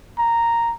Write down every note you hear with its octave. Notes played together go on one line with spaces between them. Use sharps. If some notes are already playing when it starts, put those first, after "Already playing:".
A#5